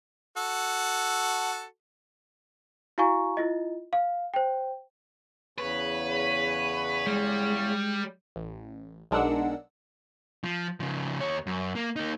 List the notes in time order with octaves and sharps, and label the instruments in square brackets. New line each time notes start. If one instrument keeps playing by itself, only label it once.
[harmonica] F#4 A4
[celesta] E4 F#4 F5 G#5 A#5 C#6
E4 F4 D#5
F5
C5 G5
[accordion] E2 C#3 C#5 [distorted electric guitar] B4
[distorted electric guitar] G3 [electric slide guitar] G#3
[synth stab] A1
B1 G#3 D4 A#4 F#5 E6
[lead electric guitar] F3
C#3 F3
D#2 C#5
F#2
A#3
A#3 D#4